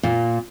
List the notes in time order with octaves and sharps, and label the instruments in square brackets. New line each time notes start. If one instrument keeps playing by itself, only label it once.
[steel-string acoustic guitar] A#2